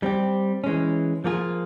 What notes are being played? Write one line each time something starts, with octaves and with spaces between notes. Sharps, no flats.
G3 C4 G4
E3 G#3 C#4
F3 A#3 F4 G#4